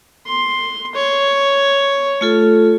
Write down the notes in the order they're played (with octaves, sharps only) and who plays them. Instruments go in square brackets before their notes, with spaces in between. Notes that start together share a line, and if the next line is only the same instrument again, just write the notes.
[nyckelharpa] C6
C#5
[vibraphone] A3 F4 A4